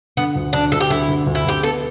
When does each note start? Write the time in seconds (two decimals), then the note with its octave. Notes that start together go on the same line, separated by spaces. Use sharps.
0.17 D3 B3
0.35 D2
0.53 D3 D4
0.72 D2 A4
0.80 G4
0.90 D3 E4
1.08 D2
1.26 D2
1.35 E4
1.45 D2 G4
1.63 B3 A4